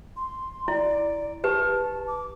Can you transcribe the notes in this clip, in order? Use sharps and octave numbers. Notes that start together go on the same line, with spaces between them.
C6
E4 D5
G4 B4 A5
D6